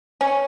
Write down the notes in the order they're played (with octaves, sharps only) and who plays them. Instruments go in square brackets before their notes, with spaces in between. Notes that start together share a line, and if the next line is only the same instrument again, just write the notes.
[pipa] C#4